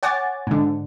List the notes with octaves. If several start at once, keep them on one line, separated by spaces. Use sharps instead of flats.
C#5 F#5 G#5 D6 A6
G#2 D3